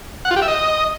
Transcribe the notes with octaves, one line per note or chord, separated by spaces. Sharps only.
F#5
F4
G4
E5
D#5